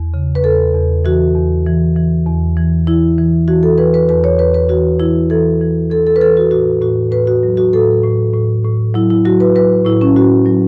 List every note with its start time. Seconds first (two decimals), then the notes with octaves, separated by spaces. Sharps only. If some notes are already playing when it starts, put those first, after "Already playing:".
Already playing: E2
0.14 C#3
0.35 B4
0.44 E2 A4
0.74 E2
1.05 E3 F#4
1.35 E2
1.66 E3
1.96 E3
2.26 E2
2.57 E3
2.87 E3 E4
3.18 E3
3.48 E3 F#4
3.63 A4
3.78 E3 B4
3.94 B4
4.09 E2 B4
4.24 C#5
4.38 E2 B4
4.54 B4
4.69 E3 F#4
4.99 E3 E4
5.30 E3 A4
5.61 E3
5.90 E3 A4
6.07 A4
6.16 B4
6.21 E3 A4
6.37 F#4
6.51 A2 F#4
6.81 A2 F#4
7.12 A2 B4
7.27 F#4
7.43 F#3
7.57 F#4
7.73 A2 A4
8.04 A2
8.34 A2
8.64 A2
8.94 F#3 E4
9.10 E4
9.25 F#3 F#4
9.40 B4
9.56 F#3 B4
9.85 A2 E4
10.01 C#4
10.16 A2 F#4
10.46 F#3